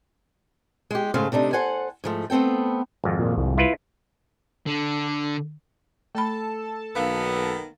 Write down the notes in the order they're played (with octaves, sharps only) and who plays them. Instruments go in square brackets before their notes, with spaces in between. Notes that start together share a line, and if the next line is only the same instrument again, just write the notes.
[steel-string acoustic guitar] G#3 G4
G#2 C#3 A3 C5 F5
C3 A3 D4 D#4
A4 C5 F#5 G#5
G#2 F3 A3
A3 B3 C4 A4 G5
[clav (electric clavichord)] G#1 F2
[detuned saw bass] A#2
C2
[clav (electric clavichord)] E4 F4 B4
[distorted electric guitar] D3
[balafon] A3 B5 [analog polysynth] A4 A5
[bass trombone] B1 [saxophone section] D#3 A#3 B3 [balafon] F5